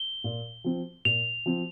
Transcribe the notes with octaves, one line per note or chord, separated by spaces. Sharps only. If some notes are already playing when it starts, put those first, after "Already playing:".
Already playing: G7
A#2
F3 C4
A#2 F7
F3 C4